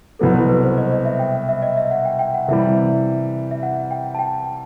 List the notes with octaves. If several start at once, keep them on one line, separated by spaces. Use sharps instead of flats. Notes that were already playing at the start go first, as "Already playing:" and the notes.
C2 B2 F#3 B3 A4
B4
B4
C5
D#5
D#5
E5
G5
E5
D#5
E5
F#5
G5
G5
F#5
C3 E3 G3 E5
E5
F#5
G5
A5
G5